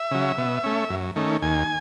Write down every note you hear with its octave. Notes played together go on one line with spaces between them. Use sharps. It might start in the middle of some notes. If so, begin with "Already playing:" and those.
Already playing: E5
C#3 F#3
B2
A3 C#4
F#2
D#3 A3 C#4
D#2 G#5